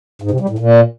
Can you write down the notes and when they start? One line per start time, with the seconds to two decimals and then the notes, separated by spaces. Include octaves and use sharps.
0.22 G#2
0.31 C3
0.40 G3
0.49 A2
0.59 A#2